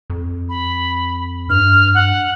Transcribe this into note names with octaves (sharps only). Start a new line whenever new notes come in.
F2
B5
G2 F6
F#5